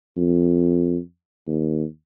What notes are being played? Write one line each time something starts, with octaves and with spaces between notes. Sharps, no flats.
F2
D#2